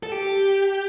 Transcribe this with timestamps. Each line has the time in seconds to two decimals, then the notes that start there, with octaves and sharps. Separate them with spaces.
0.03 A4
0.12 G4